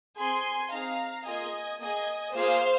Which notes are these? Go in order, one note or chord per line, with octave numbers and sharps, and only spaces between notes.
C4 G#4 G#5 C6
C4 D#4 G#4 F5 A#5
A#3 F4 G#4 D#5 G#5
A#3 G#4 D#5 G#5
A#3 F4 G#4 C5 F5